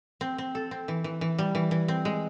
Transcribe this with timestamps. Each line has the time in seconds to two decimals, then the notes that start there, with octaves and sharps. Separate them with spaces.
0.21 C4
0.38 C4
0.55 A4
0.71 C4
0.88 E3
1.04 E3
1.21 E3
1.38 G3
1.55 E3
1.71 E3
1.88 C4
2.05 G#3